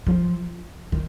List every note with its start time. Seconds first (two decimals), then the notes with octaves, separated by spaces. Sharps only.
0.07 F3
0.92 D#3